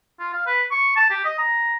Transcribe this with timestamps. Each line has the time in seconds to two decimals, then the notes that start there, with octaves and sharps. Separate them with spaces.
0.20 F4
0.33 F5
0.47 B4
0.71 C#6
0.96 A5
1.11 G4
1.25 D#5
1.39 A#5